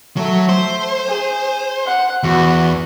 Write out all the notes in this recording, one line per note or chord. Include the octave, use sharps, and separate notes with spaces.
F#3 A3
C5
G#4
F#5
E2 F#4 B4